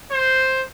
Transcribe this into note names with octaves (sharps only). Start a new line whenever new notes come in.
C5